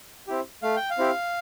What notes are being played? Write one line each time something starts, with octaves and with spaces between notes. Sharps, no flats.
C4 E4 G4
A3 F5
G5
F5
C4 E4 G4